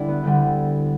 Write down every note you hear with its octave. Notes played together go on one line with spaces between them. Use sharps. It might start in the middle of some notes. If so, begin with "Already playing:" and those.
Already playing: D3 G3 D4 E4
B3
D2 D3 G3